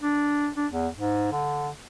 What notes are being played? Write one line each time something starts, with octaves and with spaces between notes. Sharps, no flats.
D4
D4
E2
G#2
D3